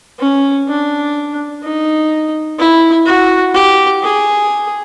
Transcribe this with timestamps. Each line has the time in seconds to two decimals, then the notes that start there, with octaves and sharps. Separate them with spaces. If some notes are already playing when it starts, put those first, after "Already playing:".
0.20 C#4
0.68 D4
1.63 D#4
2.59 E4
3.06 F#4
3.54 G4
4.03 G#4